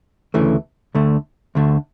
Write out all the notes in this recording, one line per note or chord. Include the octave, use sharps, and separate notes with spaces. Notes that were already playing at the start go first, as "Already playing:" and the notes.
D2 C#3 E3 A3
D2 D3 A3
D2 D3 A3